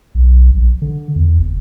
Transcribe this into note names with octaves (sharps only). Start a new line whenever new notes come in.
B1
A#1
D3
E2
F#1